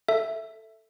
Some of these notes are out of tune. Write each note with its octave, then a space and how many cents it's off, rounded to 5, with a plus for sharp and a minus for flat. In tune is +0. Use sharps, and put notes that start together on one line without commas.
A4 +10 E5 +0